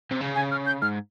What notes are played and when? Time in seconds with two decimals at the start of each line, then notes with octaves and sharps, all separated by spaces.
0.11 C3
0.21 C#3
0.35 G#5
0.51 F6
0.66 G6
0.82 G#2 F6